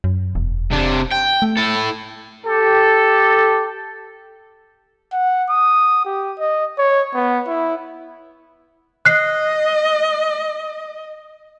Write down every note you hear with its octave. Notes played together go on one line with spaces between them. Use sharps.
F#2
E1
C3 D4
G5
A3
E4 A4
G4 A4
F#5
D#6
G4
D#5
C#5
B3
E4
D#5 F#6 C7